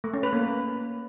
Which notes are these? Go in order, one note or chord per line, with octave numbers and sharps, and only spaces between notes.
A3
C#4
B4
A#3